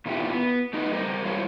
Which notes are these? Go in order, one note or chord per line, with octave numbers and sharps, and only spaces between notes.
A#2 D#3 B3 E4 F4 G4
B3
A3 D#4 E4 A#4 B4 D#5
G3 A#4 C5
G3 E4 F4 C5 C#5